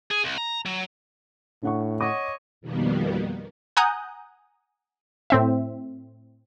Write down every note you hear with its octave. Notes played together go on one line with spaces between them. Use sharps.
G#4
C2
A#5
F#3
A2 D4 F#5 C#6
C#5 D#5 F#5 D6
F2 B2 D#3 G3 A#3 B3
F#5 G#5 A#5 D#6 F#6 G6
A2 C4 E5